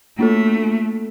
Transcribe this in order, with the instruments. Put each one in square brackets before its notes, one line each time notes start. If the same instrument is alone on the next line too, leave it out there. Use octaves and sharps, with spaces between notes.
[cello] A3 [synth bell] A#3 D4 F4 A4